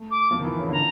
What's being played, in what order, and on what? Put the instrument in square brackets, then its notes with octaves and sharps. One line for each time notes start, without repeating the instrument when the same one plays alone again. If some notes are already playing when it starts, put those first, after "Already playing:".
Already playing: [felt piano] A3
[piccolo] D6
[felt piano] F3
D#3
E3
C#3
[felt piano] D3 [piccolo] A#5